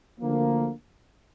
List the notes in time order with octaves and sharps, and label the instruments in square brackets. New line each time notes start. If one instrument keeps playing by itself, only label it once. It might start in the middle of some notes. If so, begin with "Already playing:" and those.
[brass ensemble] D2 D3 F3 A#3